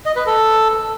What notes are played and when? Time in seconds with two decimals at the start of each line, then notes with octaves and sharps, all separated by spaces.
0.06 D#5
0.16 B4
0.26 A4